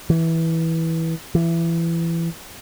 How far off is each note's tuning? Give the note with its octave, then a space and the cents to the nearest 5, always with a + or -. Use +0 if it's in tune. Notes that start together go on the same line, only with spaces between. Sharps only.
E3 -15
E3 +20